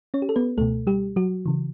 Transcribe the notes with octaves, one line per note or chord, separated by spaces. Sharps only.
C#4 C#5
G4
A4
B3 B4
C#2 B2 A3 A4
G3 G4
F#3 F#4
C#3 E3